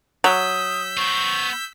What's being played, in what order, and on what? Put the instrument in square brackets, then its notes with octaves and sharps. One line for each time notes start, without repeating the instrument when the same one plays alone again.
[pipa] F#3 [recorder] D#6 [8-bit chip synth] E6 G6 B6
[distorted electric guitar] B3 C5 [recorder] C#6